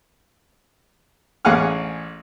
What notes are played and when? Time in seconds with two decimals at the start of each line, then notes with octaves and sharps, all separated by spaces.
1.45 A1 G#4 F5 F#5 G#5 F6